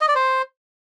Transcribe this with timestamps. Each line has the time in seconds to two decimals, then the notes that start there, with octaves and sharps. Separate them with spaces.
0.01 D#5
0.08 D5
0.15 C5